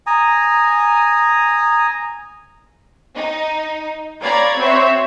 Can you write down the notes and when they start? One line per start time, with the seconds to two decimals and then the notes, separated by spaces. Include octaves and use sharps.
0.07 G#5 A#5 D#6
3.15 D#4
4.22 C#5 D5 F5 A#5 B5 G#6
4.57 C4 F#4 C5 C#5 E5